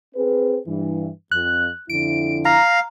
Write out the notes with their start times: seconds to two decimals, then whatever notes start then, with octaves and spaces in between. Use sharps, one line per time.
0.15 C4 G#4 B4
0.66 G2 E3
1.32 F2 F#6
1.90 F2 D3 E4 D7
2.45 F5 A#5